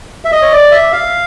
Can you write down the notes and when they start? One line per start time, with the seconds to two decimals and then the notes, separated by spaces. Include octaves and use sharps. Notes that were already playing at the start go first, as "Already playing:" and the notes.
0.25 E5
0.32 D#5
0.42 C#5
0.52 D5
0.71 E5
0.92 F5